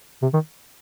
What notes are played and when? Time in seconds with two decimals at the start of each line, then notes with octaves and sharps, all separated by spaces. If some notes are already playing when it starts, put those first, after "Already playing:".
0.23 C3
0.34 D#3